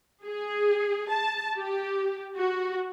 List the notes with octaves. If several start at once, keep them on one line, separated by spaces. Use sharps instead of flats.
G#4
A5
G4
F#4